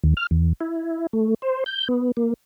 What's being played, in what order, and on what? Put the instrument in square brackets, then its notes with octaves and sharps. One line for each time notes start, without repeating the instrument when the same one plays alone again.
[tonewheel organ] D#2
F6
E2
E4
A3
C5
G6
B3
A#3